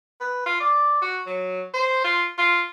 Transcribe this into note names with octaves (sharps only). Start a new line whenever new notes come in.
B4
F4
D5
F#4
F#3
C5
F4
F4